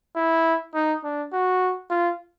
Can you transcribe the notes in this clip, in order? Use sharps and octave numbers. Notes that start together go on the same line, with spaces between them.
E4
D#4
D4
F#4
F4